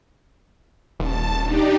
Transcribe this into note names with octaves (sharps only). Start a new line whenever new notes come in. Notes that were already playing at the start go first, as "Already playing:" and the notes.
D#1 A5
D4 D#4 G4